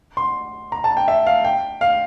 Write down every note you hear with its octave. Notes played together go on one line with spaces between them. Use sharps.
C6
A#5
A5
G5
E5
F5
G5
F5